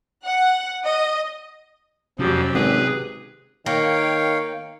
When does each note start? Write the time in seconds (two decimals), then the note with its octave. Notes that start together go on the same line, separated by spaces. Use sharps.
0.24 F#5
0.86 D#5
2.19 F2 C3 F3 F#3 C#4 G4
2.54 G#1 G#4 B4
3.66 D#3 A#3 C#5 F5 G5